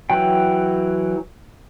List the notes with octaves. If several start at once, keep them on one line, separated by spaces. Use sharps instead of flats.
E3 F#3 G5